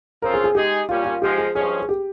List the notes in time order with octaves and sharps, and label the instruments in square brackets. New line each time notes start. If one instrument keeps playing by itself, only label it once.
[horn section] C#3 F3 C4 F4 [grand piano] A#4
[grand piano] G#4
G#4
[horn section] G#3 D#4 G#4 [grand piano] G4
[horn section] A#2 G3 C#4 [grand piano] F4
[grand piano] F4
[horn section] G#2 F3 G#3 [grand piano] G4
[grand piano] G#4
[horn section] G2 F3 G#3 C#4 [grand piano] G#4
[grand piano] G#4
G4